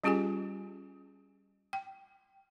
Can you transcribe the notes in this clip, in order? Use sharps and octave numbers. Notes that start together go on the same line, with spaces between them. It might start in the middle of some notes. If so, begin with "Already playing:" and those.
G3 C#4 F4 G4 G#4 G#5
G5